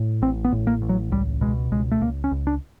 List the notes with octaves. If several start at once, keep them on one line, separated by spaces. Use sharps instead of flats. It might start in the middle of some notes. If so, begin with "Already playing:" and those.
Already playing: A2
A1 C4
B3
A2
A#3
A1
F#3
C#2 G3
B2 G#3
C#2 G#3
A3
C#2 A#3
C#4
C#2
D4